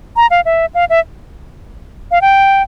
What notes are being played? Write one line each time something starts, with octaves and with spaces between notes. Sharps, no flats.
A#5
F5
E5
F5
E5
F5
G5